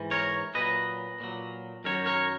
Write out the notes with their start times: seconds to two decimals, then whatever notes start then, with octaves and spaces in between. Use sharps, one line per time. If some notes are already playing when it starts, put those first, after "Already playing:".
Already playing: G#2 E3
0.11 A#4 C#5
0.54 A#2 F#3 B4 D#5
1.20 A#2 F#3
1.84 F#2 D#3 F#3 A#4 C#5
2.06 A#4 C#5